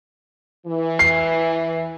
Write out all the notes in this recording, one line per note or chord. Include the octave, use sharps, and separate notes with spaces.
E3
C7